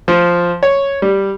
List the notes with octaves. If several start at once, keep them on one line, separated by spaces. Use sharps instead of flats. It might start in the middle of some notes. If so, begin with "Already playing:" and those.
F3
C#5
G3